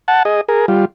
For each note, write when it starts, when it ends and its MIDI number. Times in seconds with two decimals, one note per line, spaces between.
0.08 0.23 78
0.08 0.23 81
0.25 0.41 68
0.25 0.41 75
0.49 0.66 68
0.49 0.66 70
0.68 0.85 55
0.68 0.85 65